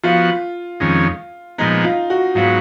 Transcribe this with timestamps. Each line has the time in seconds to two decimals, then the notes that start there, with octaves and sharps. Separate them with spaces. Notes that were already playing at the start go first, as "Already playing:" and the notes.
0.03 F3 B3 F4 F#4
0.80 F2 D#3 G#3 C#4
1.58 A#2 F3 G#3 B3 D#4
1.84 F4
2.10 F#4
2.35 G#2 F#3 B3 F4